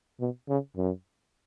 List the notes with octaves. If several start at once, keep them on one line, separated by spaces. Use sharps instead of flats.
B2
C#3
F#2